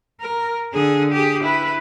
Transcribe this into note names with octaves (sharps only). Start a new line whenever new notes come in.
A#4
D3 G#4
G4 G#4
E4 B4